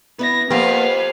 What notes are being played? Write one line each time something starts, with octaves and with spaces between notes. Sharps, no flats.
B3 E4 B4 A#6
F2 F3 A#3 B3 G4 B4 F5